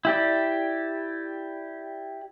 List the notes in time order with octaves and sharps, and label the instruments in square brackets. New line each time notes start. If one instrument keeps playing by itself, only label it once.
[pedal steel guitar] E4 G4 D5